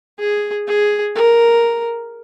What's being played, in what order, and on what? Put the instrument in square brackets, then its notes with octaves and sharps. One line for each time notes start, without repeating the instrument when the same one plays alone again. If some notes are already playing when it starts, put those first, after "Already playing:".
[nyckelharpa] G#4
G#4
A#4